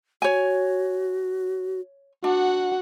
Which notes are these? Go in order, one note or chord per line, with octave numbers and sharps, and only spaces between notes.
F#4 C#5 G#5
D4 F#4 F#5